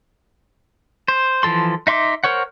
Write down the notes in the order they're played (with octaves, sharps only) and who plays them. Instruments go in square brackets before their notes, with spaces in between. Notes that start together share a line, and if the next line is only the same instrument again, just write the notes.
[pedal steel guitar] C5
E3 F3 A4 C6
D#4 E5 C6 D6
A#4 C5 C#5 F#5